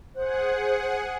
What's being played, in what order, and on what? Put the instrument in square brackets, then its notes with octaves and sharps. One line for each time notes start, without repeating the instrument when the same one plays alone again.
[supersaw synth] G#4 F#5 [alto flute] C5